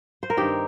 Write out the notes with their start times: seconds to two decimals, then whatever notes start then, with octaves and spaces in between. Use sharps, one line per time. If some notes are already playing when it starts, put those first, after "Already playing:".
0.23 C5
0.30 A#4
0.37 G2 D#3 C4 D#4 G4